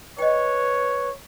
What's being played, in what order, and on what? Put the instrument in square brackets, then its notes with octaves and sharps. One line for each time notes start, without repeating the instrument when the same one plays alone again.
[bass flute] B4 [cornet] C#5 [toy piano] D#5 G5